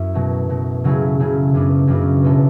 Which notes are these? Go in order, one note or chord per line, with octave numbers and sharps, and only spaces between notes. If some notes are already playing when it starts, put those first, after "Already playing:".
Already playing: F#2 E4
B2 F#3 A3
B2 F#3 A3
C#3 F#3 A3 E4 G#4
C#3 F#3 A3 E4 G#4
F#2 C#3 F#3 B3 D4
F#2 C#3 F#3 B3 D4
B2 G#3 B3 E4 A4